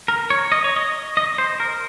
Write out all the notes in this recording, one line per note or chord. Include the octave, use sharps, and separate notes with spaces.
A#4
C#5
D#5
C#5
D#5
D#5
C5
A#4